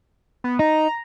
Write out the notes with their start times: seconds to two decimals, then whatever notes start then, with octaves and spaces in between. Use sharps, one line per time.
0.44 B3
0.59 D#4 A#5